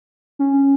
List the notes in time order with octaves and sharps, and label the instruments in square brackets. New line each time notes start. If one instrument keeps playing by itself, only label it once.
[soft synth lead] C#4